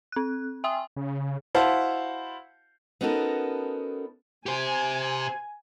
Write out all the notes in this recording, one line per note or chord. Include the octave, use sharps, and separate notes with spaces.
C4 F#6
E5 G5 G#5 C6 D#6
C#3
E4 F#4 C5 F5 F#5 A5
B3 C#4 D#4 F#4 A4 A#4
G4 C5 G#5